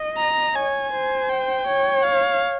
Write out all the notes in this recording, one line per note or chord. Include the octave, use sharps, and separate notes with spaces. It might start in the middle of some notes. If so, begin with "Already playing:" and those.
Already playing: D#5
A#5
C#5 G#5
C5
G5
C#5
F5